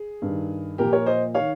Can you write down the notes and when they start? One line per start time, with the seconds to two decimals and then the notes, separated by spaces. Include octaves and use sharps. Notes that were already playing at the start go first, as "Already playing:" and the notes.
Already playing: G#4
0.22 G2 D#3
0.78 A#2 F3 G4 A#4
0.92 A#4 C#5
1.06 C5 D#5
1.34 D#3 C#5 F5